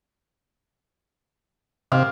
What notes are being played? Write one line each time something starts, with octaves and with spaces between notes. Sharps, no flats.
C3 F5